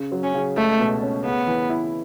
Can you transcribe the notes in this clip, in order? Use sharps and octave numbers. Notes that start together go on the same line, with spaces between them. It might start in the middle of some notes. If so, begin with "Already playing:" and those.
Already playing: C#3
F#3
C#4
C#3
C#2 A3
B2
C#4
C#3 B3
E3
E4